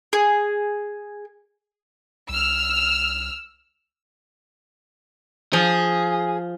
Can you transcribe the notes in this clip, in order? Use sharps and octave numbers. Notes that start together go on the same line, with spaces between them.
G#4
C2 E6 F6
F3 G#4